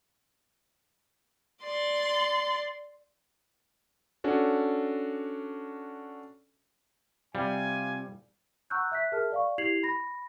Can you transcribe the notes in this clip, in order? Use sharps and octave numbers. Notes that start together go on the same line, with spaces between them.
D5 C6
C#4 D4 F#4 A4
C3 G3 F4 G#5
F#5 A#5 C#6 E6 F#6 G6
E5 F#6 B6
G#4 A#4 E5 A5 F6
D5 F5 C#6
E4 G4 G#6 C7 F7 F#7
B5 A#6